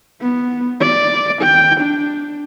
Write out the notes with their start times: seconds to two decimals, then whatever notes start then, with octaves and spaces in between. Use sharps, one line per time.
0.21 B3
0.81 D5
1.42 G5
1.81 D4